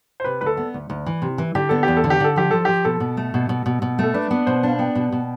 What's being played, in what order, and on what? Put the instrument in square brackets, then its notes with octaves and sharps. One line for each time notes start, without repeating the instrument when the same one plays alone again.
[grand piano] C5
[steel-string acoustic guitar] C3 [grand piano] B4
[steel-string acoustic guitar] D2 [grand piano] B4
[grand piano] A4
[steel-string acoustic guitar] B3
D2
D2
E3
C3
E3
[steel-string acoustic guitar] D3 [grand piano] G4
[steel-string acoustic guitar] B3 [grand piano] A4
[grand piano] G4
[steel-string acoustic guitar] E2
[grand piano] A4
[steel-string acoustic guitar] D3
[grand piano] G4
[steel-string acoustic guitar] D3 [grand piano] A4
[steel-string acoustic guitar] F3 [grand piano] G4
[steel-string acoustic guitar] F3 [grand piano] A4
[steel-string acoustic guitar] F3 [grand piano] G4
[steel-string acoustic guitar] B2 [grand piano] A4
[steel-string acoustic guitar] B2
A3
B2
B2
B2
B2
[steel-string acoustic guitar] A3 [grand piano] A4
[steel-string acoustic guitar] D4 [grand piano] B4
[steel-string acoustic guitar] B3
[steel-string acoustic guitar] B2 [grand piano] C5
[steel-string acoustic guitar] D4 [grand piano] F5
[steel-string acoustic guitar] B3 [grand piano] G5
[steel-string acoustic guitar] B2
B2